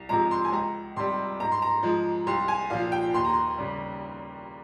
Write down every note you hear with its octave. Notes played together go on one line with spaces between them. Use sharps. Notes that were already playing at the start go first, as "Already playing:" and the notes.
Already playing: C2
C3 F3 G#3 A#5
C6
G#5
C#2 A#5
C3 G3 C6
G#2 A#5
C6
A#5
F3 G#3
C2 C6
G#5
A#2 F3 F5
G5
D#2 C6
A#5
C6
C#3 G3